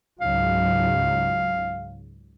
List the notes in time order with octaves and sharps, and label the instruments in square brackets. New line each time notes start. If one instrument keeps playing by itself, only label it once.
[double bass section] C#2 G#2 F#3 [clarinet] F5